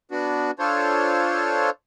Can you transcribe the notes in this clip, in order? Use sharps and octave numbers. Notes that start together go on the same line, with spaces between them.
B3 D4 F#4
D4 F4 A4 C5 C#5